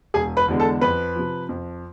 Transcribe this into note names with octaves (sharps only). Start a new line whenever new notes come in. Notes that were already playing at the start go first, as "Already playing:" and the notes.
E1 G#4 G#5
B4 B5
E2 D3 G#3 B3
A4 A5
F2 B4 B5
C3 F3
F2